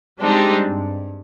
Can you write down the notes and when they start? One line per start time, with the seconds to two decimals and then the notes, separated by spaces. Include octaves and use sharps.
0.21 G3 G#3 C4 D4 D#4 G4
0.66 G2